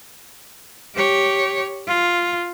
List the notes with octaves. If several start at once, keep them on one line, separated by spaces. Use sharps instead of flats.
G4 C#5
F4